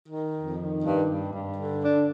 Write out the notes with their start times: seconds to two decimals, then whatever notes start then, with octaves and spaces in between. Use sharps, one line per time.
0.09 D#3
0.34 F2
0.58 D#3
0.83 G2
1.08 G2
1.32 G2
1.57 D3
1.82 D4